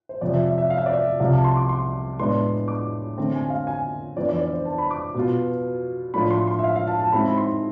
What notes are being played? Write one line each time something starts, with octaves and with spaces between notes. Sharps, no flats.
C5
F2 C3 F3 D5
E5
E5
E5
F5
E5
D5
E5
C2 C3 F3 F5
A5
C6
D6
C6
A2 G#3 B3 D4 C6
D6
D3 A3 C4
G#5
F5
G#5
F2 E3 B3 D4 D5
D5
D5
C5
A5
B5
D6
B2 B3 F4
A2 F3 A3 D4 F4 B5
C6
C6
E5
F5
F5
A5
A5
G#2 G#3 C4 E4 B5
B5
C6